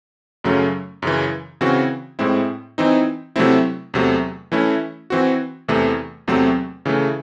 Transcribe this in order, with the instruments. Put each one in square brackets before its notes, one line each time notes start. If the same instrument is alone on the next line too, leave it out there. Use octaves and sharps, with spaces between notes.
[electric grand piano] F#2 C#3 F#3 A3 C#4
F#2 C#3 E3
C#3 E3 C4 F#4
A2 G#3 C4 E4
E3 C4 D#4
C3 F#3 A3 C4 E4
E2 C3 F#3 A3
E3 A3 C#4 E4
E3 C4 F#4
E2 C3 E3 A3
E2 C3 F#3 A3 C4
C#3 E3 A3